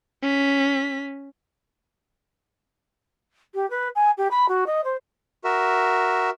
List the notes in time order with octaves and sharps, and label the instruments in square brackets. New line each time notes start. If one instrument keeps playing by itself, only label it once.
[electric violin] C#4 B6
[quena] G4
B4
G#5
G4
B5
F#4
D#5
C5
[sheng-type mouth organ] F#4 A#4 E5